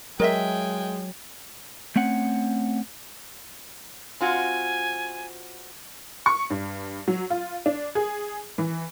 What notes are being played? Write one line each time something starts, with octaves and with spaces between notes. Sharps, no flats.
F#3 G#3 A#4 D#5 E5 G5 G#5
A3 C4 C#4 F#5
C4 F4 F#4 G#5
C#6
G2
F#3
F4
D4
G#4
E3